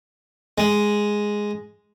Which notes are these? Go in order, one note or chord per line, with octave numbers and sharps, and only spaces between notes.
G#3